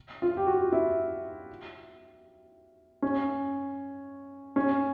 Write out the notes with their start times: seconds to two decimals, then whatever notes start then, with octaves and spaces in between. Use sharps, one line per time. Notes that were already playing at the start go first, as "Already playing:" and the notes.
0.22 F4
0.37 G4
0.47 F#4
0.72 E4
3.02 C#4
4.56 C#4